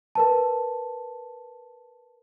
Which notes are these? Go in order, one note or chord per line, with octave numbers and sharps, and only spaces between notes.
A#4 B4 A5